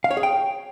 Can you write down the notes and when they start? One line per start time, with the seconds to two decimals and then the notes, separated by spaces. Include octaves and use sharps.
0.04 F5
0.11 C#5
0.17 G#4
0.23 G5